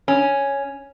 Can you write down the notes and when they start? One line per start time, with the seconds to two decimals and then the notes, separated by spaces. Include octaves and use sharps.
0.08 C#4